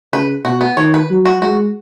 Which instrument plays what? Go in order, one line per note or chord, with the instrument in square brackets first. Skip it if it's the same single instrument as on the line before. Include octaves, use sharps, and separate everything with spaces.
[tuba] C#3 [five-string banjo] B4
[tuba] B2 [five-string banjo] F#4
[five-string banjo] B3
[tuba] D#3 [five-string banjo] C#5
[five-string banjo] B4
[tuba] F#3
[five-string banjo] F#4
[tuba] G#3 [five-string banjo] F#4